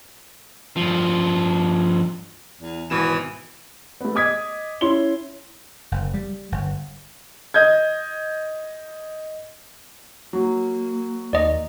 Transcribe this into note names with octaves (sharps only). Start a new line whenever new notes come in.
G2 F3
E2
G#1 B2 E3 E7
A3 B3
D#5 D6 D#6 G#6 B6
C#4 E4 C6 G7
F#1
G3
G1
D#5 G6 G#6
F#3 A#3
D#2 D5 D#5